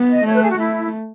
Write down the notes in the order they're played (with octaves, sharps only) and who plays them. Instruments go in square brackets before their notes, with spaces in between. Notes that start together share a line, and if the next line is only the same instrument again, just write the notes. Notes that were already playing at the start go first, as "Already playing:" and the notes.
Already playing: [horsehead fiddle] B3
[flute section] D#5
[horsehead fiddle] A3 [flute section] C#5
[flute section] B4
G#4
F#4
[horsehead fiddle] A3 [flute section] E4